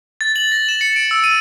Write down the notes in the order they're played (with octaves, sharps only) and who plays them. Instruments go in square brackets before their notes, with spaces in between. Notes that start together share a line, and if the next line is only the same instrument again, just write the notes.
[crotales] A6
F#7
A#6
E7
C#7
D7
E6
D#7